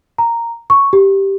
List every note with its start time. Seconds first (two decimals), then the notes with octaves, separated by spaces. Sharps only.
0.18 A#5
0.70 C#6
0.93 G4